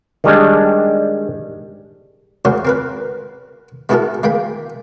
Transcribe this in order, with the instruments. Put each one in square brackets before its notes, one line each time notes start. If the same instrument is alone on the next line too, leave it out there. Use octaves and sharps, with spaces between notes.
[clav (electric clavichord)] D#3 G3 G#3 D4
[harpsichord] C#2 C#4 F#4 A#4 C5
C4 A#4 B4
G#3 B3 E4 F#4 A4 A#4
G#3 A#3 G5 B5